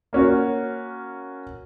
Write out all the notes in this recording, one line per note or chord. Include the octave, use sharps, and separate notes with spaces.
A#3 C#4 F#4